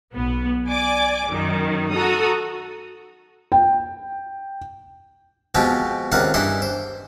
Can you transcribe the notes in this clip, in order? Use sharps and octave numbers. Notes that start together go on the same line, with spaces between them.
B1 B3
D5 G#5 D6
F#2 D#3
F#4 A4 A#5 D#6
G5
B2 F3 G#3 C4 F4 G4
C#2 C3 D#3 F4 F#5
G2 E3 G3 E4 D#5 C6
C5